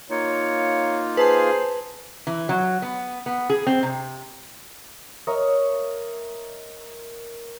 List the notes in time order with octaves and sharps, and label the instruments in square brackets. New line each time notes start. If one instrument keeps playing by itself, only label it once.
[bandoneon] A#3 D#4 F4 [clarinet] C#5
[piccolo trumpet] G#4 [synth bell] B4 A5 C6 [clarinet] C5
[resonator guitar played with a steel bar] E3
F#3
B3
B3
G#4
C4
C3
[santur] A#4 C#5 D#5 E5